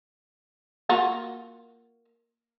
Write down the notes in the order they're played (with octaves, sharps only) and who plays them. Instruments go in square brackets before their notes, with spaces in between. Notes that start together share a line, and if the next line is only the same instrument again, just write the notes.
[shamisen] A#3 F4 F#4